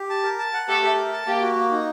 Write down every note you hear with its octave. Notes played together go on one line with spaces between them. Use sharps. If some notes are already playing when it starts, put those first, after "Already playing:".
Already playing: G4
A5
A#4
A5
F#5
A3 G4 A4
G4
A#4
A5
A#3 G4
F#4
A#3
D#4